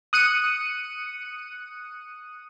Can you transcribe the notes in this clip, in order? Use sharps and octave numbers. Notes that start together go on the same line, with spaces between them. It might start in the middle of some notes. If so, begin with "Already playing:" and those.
D#6 F#6 C#7 D#7